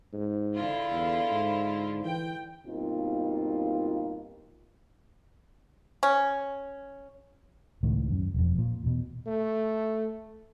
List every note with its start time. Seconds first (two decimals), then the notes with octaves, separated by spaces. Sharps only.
0.13 G#2
0.55 D3 E4 F4
0.91 E2
1.31 G#2
2.05 E3 G5
2.67 G2 B2 A#3 C4 D#4 F4
6.03 C#4
7.83 C#2 A2 D#3
8.11 F#2
8.34 E1 F2
8.58 A#2
8.84 E2 B2
9.26 A3